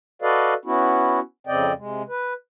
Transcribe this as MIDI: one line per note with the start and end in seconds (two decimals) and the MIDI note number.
0.22 0.54 66
0.22 0.54 69
0.22 0.54 71
0.22 0.54 74
0.22 0.54 75
0.22 0.54 77
0.65 1.20 59
0.65 1.20 61
0.65 1.20 64
0.65 1.20 66
1.47 1.72 41
1.47 1.72 49
1.47 1.72 60
1.47 1.72 74
1.47 1.72 75
1.47 1.72 79
1.78 2.03 48
1.78 2.03 56
2.09 2.33 71